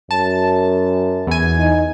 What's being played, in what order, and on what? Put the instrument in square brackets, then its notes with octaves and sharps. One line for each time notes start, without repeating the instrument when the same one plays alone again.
[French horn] F#2 [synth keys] A5
[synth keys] E2 G#5
[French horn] D#4